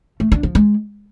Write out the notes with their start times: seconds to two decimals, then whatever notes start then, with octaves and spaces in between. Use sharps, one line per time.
0.20 A3
0.32 D4
0.43 F3
0.55 G#3